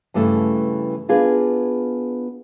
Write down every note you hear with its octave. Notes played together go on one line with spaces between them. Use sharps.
G2 C#3 E3 A3
B3 D4 F4 G#4 A#4 B4